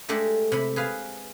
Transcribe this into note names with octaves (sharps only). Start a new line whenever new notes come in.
G#3 A3 D4 G4 A4
C3 B5
G#4 B4 F5